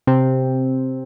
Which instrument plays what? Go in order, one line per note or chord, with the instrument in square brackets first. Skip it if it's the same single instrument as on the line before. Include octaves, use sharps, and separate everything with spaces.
[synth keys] C3 C4